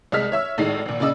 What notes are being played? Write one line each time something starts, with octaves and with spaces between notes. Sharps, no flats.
C2 G#3 D#5 F6 B6
C#5 E5 E6
G#1 A2 G#3 D#4 C7
G#1 A#2
A#2 C#3 D5 D#5 E6